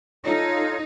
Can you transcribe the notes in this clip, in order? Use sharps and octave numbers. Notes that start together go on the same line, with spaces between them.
D#4 F4 A4 C#5